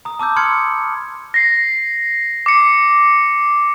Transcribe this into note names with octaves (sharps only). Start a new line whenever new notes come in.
A#5 D#6
A5 D6 E6 G6
B5 C6 D#6 F6 G#6 C#7
A#6 C7
D6 C#7